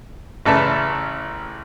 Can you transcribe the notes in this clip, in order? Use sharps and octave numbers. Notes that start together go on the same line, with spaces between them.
A1 C#3 A4 B4 D5 E5